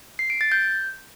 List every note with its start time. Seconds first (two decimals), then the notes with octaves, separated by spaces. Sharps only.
0.19 C7
0.30 D7
0.41 A6
0.52 G6